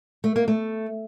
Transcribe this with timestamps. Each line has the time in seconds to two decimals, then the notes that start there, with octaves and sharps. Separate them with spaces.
0.24 A3
0.36 A#3
0.48 A3